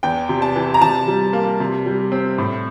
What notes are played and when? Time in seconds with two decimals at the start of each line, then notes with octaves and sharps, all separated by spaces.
0.03 E2 G5
0.29 C3
0.42 A5
0.56 E3
0.74 A#5
0.81 C3 A5
1.08 G3
1.33 A#3
1.60 C3
1.86 G3
2.12 C4
2.38 A2